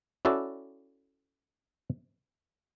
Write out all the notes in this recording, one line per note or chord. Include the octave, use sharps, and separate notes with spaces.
C#4 E4 F#4 A4 D5